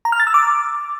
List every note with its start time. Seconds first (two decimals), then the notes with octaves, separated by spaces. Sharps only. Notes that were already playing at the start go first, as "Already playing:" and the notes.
0.05 A#5
0.12 F6
0.20 A6
0.27 E6
0.34 D6